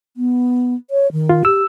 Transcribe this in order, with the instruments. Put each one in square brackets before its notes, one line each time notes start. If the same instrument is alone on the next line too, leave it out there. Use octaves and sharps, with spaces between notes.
[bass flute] B3
C#5
D#3
[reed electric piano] F4
[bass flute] G4 [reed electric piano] E6